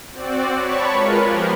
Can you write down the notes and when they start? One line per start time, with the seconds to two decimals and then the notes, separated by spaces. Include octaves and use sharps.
0.12 C4 F#4 D5
0.54 C#5 A5 B5 C#6
0.89 G#3 F4 A#4 B4
1.24 F3 B3 G4 A#4 C5